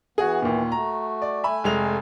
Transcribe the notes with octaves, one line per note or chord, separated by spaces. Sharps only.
E3 B3 F#4 G#4
D#2 A#2
A3 F#4 A#5
D5
A3 E5 G#5 B5
F1 G#3 F7